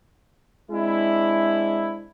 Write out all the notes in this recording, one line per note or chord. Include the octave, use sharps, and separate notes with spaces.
G#3 C4 D4 E4